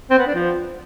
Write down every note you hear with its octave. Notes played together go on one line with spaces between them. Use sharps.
C4
B3
D4
F3